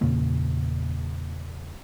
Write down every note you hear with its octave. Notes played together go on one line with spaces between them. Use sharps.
E2 A#2 C#3 A#3